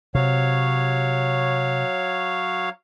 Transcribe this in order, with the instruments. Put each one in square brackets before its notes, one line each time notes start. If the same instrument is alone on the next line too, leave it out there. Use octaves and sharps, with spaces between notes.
[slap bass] C3 [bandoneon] F#3 C#5 F5